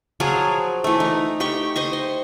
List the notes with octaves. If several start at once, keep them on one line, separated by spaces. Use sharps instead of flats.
F3 F#3 F4 G#4
E3 A3
D#4
G4 G5 C#6
C5 D#5 C#6
C6